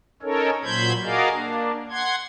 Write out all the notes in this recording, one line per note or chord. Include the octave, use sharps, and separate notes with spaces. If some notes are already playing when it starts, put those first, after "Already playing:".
C#4 D#4 A4 A#4 C#5
A#2 F#3 C5 B5 G6 G#6
F#4 G#4 A#4 D5 D#5 F5
A#3 D4
F#5 C6 G#6